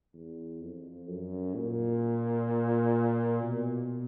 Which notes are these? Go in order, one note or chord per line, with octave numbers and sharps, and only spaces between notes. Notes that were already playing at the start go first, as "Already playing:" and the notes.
E2
F2
F#2
A#2
B2